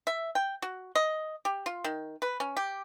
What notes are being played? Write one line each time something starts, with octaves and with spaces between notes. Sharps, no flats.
E5
G5
F#4
D#5
G4
F4
D#3
B4
C#4
G4